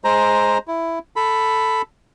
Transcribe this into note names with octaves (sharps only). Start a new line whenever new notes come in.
G#3 C5 A#5
E4
A4 B5